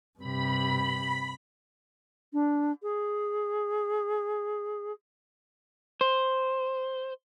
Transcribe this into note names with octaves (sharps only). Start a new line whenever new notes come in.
G2 C3 B5
D4
G#4
C5